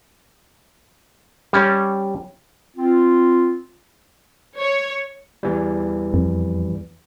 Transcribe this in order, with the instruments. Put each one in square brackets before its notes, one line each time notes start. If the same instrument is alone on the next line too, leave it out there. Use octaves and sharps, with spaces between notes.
[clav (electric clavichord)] G3 C#4
[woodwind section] C4 F4
[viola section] C#5
[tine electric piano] E2 E3 G3
[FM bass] F2